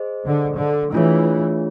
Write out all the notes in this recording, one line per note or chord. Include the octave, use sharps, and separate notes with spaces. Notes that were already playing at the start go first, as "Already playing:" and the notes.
Already playing: G#4 C5 D#5
D3
D3
E3 A3 D4 F4 G#4 C#5